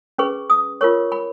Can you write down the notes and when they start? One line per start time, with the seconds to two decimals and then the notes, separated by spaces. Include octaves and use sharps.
0.18 C#4 G#4 B4 C#6
0.50 D#6
0.81 F4 A#4 C#5 C#6
1.12 B5